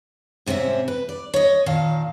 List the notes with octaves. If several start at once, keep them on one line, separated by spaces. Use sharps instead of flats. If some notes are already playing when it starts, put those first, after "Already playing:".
G#2 C3 C4 C#4 E5
B4
D5
C#5 D#5
A#2 D#3 F5 A5